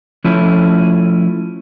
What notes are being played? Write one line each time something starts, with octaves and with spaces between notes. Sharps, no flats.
F3 A3 C#4 E4